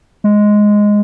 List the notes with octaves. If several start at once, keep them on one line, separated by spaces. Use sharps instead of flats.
G#3